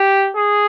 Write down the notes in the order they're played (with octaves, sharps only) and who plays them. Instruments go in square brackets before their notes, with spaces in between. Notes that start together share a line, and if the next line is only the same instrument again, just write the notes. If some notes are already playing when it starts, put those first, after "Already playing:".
Already playing: [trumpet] G4
G#4